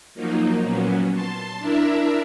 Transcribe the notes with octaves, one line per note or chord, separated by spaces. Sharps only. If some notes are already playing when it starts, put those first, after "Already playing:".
F3 F#3 A#3 D#4
A#2 F#3 B3 C#4
A5 C6
D4 E4 A#4 E5